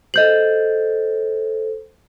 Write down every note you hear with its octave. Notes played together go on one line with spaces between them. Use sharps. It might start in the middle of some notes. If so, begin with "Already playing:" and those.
A4 C5 D#5 G6 F#7